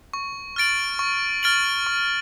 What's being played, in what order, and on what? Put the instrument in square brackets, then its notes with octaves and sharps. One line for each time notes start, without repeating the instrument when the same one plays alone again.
[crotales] C#6
F6 A6 D7 F#7
C#6
F6 A6 D7 F#7
C#6